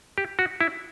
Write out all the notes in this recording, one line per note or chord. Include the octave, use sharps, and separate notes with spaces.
G4
F#4
E4